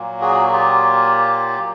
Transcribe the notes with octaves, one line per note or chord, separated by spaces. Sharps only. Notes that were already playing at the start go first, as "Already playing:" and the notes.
Already playing: A#2 F#3 A#3
F#4 G#4
F4 G4